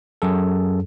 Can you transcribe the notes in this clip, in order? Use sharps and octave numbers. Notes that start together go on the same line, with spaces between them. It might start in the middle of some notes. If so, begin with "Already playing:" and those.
F#2 F#3 G#4 A4